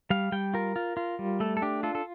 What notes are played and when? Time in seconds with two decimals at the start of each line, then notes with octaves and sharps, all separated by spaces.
0.10 G3 F5
0.32 G3 G5
0.54 F4 A#4
0.76 F4
0.97 F4
1.19 G3
1.40 A3 A4
1.57 A4
1.62 D4 G4
1.83 F4 A4
1.95 A4